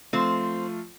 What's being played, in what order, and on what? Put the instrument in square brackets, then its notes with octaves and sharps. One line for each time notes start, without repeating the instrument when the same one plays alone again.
[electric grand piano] F3 A3 F4 [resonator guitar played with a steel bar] C4 C5